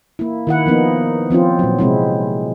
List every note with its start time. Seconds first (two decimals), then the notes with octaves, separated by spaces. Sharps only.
0.19 A#3 E4
0.47 D#3 E4 F#5
0.66 F3 A#3 B3 D#4
1.30 F3 C4 C#4 F4
1.59 A#2 F#3
1.79 C3 G#3 C4 E4